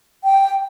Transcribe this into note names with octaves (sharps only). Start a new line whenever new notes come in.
G5